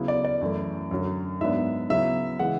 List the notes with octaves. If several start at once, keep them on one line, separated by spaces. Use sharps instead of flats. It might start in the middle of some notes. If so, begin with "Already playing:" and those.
Already playing: C#3 F#3 B3 E4
D5
D5
F#2 E3 A3 E4
F#2 D3 F#3
G#2 F#3 B3 D4 E5
C#3 F#3 B3 E4 E5
C#3 E3 G#3 F#5